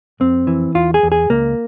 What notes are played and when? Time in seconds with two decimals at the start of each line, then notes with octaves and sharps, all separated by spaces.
0.20 F2 C4
0.47 E3
0.75 E2 F4
0.94 G#4
1.03 E2
1.12 G#4
1.30 C#2 A#3